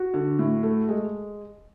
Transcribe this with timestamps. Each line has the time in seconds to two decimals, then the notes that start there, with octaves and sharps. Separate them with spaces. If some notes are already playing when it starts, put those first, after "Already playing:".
Already playing: F#4
0.14 D3
0.39 A2
0.63 A3
0.89 G#3